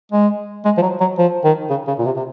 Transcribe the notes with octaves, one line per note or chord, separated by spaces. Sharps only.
G#3
G#3
F3
F#3
F#3
F3
D#3
C#3
C#3
A#2
C3
C3